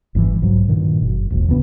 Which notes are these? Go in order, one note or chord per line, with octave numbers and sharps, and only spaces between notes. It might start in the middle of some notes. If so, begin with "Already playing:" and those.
G1 G#2 C#3 E3
B1 G#2 F#3
G2 A#2 D#3
F#1
E1 A#1
C#2 C#3 B3 D4